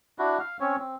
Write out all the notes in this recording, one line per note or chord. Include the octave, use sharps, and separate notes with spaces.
D4 E4 F#4
F5
C4 C#4 C#5
C4